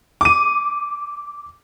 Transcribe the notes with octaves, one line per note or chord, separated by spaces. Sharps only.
D6 D#7